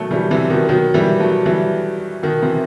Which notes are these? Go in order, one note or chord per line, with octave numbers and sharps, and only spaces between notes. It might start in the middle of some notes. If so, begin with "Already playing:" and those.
Already playing: B2 D#3 F#3 A3
E3 G3
C3 E3
B2 D#3
D#3 F#3
E3 G3
F#3 A3
E3 G3
B2 D#3
C3 E3